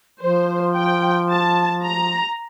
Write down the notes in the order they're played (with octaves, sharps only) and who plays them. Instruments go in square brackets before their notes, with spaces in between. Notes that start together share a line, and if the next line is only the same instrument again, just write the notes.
[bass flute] F3 [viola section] C5
[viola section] G5
A5
A#5